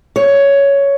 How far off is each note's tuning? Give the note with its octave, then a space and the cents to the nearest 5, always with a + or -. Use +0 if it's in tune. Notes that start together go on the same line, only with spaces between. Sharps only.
C#5 +10